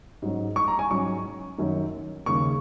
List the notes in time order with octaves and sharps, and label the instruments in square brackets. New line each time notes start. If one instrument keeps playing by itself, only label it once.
[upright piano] G#2 F#3 C#4
C#6
A#5
G#5
G#2 F#3 C#4 C#6
F#2 D#3 F#3 C#4
D#2 C#3 A#3 C#6